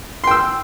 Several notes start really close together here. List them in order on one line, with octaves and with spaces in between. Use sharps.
C6 G5 E6